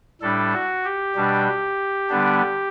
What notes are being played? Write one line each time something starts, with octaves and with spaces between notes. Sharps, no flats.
A2 G3 D4 A4
F#4
G4
B2 G3 D4
D3 G3 B3 D4